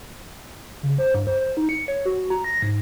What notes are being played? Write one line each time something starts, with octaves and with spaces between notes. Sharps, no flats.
C#3
C5
G2
C5
C5
D#4
C#7
C#5
F#4
A#5
A#6
G#2